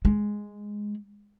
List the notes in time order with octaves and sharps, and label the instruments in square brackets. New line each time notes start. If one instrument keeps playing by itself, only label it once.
[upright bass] G#3